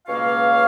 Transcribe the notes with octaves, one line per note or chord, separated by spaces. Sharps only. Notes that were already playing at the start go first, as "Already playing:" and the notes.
C#2 B2 A#3 C#5 F5